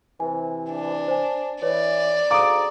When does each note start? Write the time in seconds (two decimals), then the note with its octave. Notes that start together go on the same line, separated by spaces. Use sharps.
0.20 C3 E3 G#5
0.71 D4
1.08 C5 G#5
1.63 E3 C#5 D5
2.31 D2 G#2 F5 A#5 D6 D#6 D7